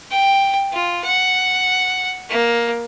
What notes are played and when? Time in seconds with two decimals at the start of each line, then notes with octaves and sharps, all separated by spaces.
0.11 G5
0.72 F4
1.04 F#5
2.29 A#3